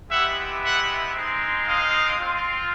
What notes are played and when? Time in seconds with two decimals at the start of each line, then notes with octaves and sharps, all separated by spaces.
0.11 G#3 B3 E4 G4 E5 F#5
0.63 E5 F#5
1.14 G#3 C4 D#4
1.66 D#5 F5
2.18 C4 F4